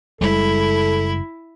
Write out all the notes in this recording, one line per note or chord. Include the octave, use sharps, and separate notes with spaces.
F#1 G3 G#3 E4 A4